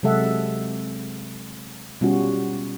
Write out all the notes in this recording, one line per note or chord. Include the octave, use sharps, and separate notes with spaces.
C3 F#3 G#3 A4 E5 F#5
B2 G3 C#4 F4 F#4